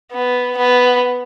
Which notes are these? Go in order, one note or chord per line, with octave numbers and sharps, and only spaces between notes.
B3
B3